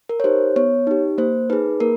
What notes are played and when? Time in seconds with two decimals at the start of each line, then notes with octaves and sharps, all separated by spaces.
0.09 A#4
0.20 C#5
0.24 D#4 G4 C5
0.56 B3 C#5
0.87 D#4 G4
1.18 A#3 C5
1.50 D#4 G#4 B4
1.80 A#3 A#4